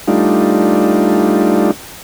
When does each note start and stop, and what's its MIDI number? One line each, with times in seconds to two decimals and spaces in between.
0.08 1.71 55
0.08 1.71 57
0.08 1.71 62
0.08 1.71 63
0.08 1.71 65